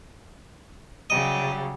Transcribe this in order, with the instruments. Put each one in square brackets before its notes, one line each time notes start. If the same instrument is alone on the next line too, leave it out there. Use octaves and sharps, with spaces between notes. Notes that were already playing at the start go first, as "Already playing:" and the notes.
[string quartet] C#3 F#3 G3 [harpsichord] D#5